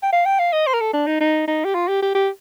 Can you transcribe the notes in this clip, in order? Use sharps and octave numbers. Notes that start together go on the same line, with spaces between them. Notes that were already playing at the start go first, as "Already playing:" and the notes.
G5
F5
G5
F5
D#5
C5
A#4
A4
D4
D#4
D#4
D#4
G4
F4
G4
G4
G4